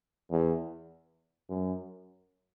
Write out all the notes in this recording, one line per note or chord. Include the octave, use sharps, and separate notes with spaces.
E2
F#2